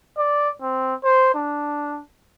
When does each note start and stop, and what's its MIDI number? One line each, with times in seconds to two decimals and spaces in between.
0.18 0.50 74
0.62 0.95 60
1.04 1.31 72
1.35 2.01 62